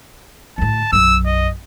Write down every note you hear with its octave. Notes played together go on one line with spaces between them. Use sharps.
D2 A2 A5
B1 F#2 E6
D#5